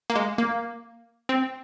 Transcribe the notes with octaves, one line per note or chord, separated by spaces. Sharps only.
A#3
G#3
A#3
C4